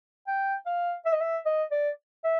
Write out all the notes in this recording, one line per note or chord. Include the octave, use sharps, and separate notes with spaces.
G5
F5
E5
D#5
E5
D#5
D5
E5